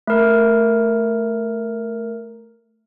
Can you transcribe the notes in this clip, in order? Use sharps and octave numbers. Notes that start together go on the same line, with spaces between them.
A3 A#4